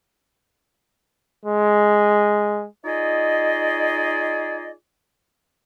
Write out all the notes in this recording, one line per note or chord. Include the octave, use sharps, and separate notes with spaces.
G#3
D#4 F4 G#4 D5 D#5